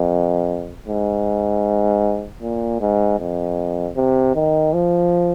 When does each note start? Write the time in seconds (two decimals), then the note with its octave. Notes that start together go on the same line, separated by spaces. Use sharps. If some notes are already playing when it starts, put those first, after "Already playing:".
Already playing: F2
0.88 G#2
2.42 A#2
2.80 G#2
3.19 F2
3.96 C3
4.35 D#3
4.73 F3